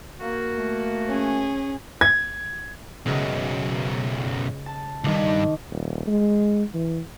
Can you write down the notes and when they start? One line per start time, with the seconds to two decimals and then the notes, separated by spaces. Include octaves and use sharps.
0.20 A#3 F#4
0.58 A3
1.08 C#4 G#4
2.01 G#6
3.06 B1 F#2 C#3 G#3
4.66 A5
5.04 C#2 G2 D#3 D6
5.71 D#1
6.07 G#3
6.74 E3